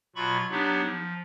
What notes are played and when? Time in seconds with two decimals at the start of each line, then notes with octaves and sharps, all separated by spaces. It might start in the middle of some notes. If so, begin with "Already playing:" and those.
0.16 B2 F#3 F4 B5 C#6
0.50 F#3 B3 D4 D#4 G4
0.83 F3